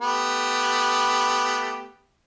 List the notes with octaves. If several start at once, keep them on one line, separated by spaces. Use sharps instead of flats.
A3 B3 G4